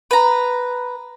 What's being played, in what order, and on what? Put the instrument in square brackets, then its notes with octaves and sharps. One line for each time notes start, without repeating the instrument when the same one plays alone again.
[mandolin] B4 A#5